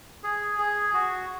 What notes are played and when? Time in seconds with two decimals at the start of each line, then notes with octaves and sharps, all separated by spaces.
0.23 G#4
0.59 G#4
0.94 F#4